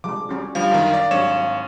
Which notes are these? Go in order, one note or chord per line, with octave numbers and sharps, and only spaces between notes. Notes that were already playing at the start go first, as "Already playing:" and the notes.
F3 G3 G#3 D6
G3 C#4 F#4
D3 F3 G3 D4 C#5 F5
F#2 D#3
D5
G#1 F#3 G3 D4 C#5 E7